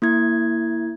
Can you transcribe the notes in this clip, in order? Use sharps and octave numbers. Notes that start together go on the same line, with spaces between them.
A#3 E4 G#6